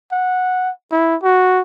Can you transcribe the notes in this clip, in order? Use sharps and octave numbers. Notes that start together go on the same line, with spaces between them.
F#5
E4
F#4